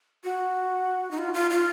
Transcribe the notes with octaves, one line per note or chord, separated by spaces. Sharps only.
F#4
D#4
F4
F4
F4